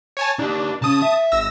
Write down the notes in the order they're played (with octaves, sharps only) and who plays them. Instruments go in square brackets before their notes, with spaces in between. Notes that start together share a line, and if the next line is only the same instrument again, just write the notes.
[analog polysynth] C#5 G#5 A5
[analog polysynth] D4 [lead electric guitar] D#4 G4
[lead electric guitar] C#3 C#4 [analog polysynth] A5 D#6
[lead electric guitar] E5
[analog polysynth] G#1 E6 A#6